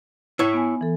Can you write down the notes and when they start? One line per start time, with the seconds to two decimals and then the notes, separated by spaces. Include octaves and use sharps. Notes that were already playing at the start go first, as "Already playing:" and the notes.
0.39 E4 C#5
0.53 B3 G#5
0.81 E3 A4